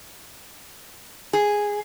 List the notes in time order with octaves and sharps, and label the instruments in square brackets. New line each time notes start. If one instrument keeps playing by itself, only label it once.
[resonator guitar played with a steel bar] G#4